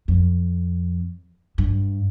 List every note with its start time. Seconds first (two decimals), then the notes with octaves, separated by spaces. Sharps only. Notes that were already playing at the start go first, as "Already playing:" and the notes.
0.08 F2
1.58 G2